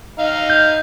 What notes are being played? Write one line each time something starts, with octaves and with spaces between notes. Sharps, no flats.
D#4 F5
G6